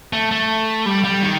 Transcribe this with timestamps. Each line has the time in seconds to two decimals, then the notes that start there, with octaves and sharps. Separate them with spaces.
0.13 A3
0.31 A3
0.86 G3
1.04 G3
1.23 D#3